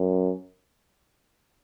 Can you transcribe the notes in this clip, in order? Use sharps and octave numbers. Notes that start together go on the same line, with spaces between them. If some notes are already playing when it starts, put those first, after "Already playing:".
Already playing: F#2